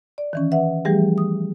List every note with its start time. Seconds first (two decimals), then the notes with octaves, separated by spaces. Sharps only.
0.18 D5
0.33 D#3 E3 C#4
0.51 B4 E5 F#5
0.85 E3 F3 G3 A3 G4 G#4
1.18 D#6